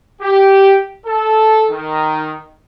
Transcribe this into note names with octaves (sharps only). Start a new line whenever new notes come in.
G4
A4
D#3